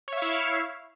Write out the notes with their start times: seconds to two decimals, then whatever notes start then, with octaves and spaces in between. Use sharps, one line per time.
0.08 C#5
0.13 E5
0.17 F5
0.22 E4